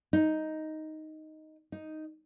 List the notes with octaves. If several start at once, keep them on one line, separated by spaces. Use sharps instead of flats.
D#4
D#4